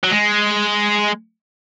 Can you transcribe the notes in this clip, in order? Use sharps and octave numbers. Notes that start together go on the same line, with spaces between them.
F#3
G#3